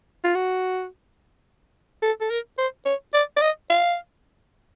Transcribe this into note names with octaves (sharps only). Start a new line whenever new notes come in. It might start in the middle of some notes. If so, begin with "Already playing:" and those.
F4
F#4
A4
A4
A#4
C5
C#5
D5
D5
D#5
F5